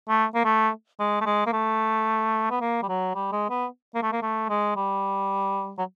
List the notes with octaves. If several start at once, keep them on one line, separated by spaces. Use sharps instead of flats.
A3
A#3
A3
G#3
A3
G#3
A#3
A3
B3
A#3
G3
F#3
G3
G#3
B3
A#3
A3
A#3
A3
G#3
G3
F#3